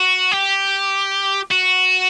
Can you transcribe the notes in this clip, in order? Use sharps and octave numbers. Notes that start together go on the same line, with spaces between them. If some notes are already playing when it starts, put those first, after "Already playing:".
Already playing: F#4
G4
F#4